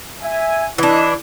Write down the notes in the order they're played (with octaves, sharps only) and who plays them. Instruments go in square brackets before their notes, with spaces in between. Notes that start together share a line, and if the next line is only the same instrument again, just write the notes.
[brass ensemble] E5 G#5
[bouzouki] E3 D4 [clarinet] E4 [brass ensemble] D#5